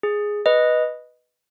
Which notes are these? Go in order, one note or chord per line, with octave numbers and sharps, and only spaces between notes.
G#4
B4 D#5